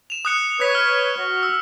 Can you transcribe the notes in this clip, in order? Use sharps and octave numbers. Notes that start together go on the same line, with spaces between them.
E7 F7
D#6 F#6 C#7
B4 C#5 D#6 F#6 B6
F6
F#4
E6